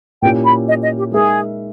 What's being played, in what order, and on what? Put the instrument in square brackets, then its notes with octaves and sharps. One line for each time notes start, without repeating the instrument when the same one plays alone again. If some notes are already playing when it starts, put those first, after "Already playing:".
[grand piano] A#2 A#3 C#4 E4 G4 [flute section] G5
[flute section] B5
D#5
D#5
G4
[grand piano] G#3 D#4 A#4 E5 [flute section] G#4